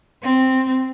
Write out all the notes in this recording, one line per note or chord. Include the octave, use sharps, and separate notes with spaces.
C4